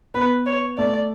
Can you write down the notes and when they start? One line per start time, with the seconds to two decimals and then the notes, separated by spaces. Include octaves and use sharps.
0.14 B3 B4
0.46 C#5
0.78 A3 D5